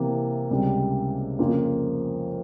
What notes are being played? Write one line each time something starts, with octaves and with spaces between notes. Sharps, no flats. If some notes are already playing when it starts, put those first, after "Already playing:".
Already playing: C3 E3 A#3
C#2 C3 G3 C4
F2 C#3 F3 A#3 F4